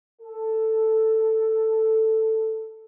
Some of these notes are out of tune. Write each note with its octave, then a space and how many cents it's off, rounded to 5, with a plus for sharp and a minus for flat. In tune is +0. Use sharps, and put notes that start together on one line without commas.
A4 +5